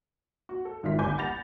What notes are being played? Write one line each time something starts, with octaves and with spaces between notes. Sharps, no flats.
F#4
A4
G#1 D#3 E4 F4 F5 B6
G1 C2 G#5 D6 G6
F#5 B5 A6 A#6 F7